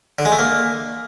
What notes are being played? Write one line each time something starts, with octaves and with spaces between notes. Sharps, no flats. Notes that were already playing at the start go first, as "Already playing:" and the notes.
D3
G#3
A3
A#3